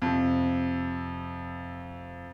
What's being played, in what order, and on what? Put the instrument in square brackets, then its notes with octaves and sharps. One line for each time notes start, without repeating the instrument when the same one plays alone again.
[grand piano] F2 C3